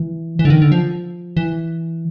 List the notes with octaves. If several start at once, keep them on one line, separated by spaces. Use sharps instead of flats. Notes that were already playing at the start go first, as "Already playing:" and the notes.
Already playing: E3
E3
D3
D#3
D3
F3
E3